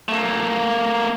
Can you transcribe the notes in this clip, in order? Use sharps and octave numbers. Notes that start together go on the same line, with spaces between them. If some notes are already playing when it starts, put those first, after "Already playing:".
A3 A#3